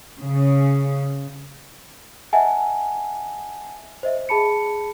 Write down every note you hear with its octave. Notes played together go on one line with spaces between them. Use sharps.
C#3
D#5 E5 F#5 G#5 A5
C5 D#5 E5
G#4 A5 B5 C#7